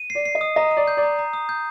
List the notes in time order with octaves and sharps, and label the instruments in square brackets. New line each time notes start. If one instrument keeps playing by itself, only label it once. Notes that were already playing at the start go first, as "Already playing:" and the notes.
Already playing: [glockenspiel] D#7
C7
[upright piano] D5
[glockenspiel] C7
[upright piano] D#5
[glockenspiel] D#6
[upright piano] D#5 [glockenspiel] A#5
[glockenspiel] D#6
[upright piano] D5
[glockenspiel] G6
[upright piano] D5
[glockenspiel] A#5
A#5
D#6
G6